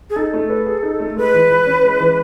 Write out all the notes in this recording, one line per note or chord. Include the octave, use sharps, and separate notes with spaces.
G#4
D#4 A4
A3
B4
G#4
D#4
A3
G#3 B4
E3
E3
C#4
G#3
E3